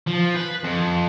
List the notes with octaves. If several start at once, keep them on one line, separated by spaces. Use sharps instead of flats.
F3
B4
F2